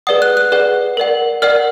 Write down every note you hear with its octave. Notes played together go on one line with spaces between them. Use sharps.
G#4 B4 D5 F#5 D#6
F#6
F#6
G#4 B4 D5 F#5
A#4 D5 F#5
A#4 D5 F#5 F6